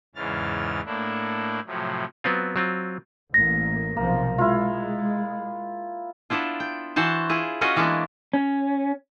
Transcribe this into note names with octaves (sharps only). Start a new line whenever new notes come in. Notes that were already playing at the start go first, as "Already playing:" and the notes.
E2 G#2 C#3 E3 F6 A6
A2 A3 A#3 D4 E4
A2 C3 F3 F#3
F#3 B3 C4 F4
F#3 C4 F4
A1 A#3 A#6
B1 C3 F3 A#3
G#3 E4 F4
B3 D4 E4 F4
G5
E3 F#4 C5 A5
E4 F4 G#4
C#4 F4 F#4 D#5
E3 G#3 A#3 B3 D4
C#4